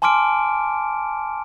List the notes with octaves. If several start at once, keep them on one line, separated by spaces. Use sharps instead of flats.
G#5 A5 C6 D6 F6 D7